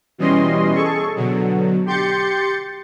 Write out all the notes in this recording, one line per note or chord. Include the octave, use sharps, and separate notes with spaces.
B2 E3 G3 C#4 D#5 C6
G#4 A4 C#6
B2 D3 F#3
G4 C6 G6 A6 C#7